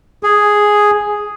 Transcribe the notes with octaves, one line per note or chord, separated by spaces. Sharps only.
G#4